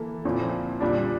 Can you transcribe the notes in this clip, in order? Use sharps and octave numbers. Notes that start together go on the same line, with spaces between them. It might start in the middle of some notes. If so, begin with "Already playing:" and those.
Already playing: E3 A#3 E4 A4
A#2 F3 C4 E4
A#2 G3 D4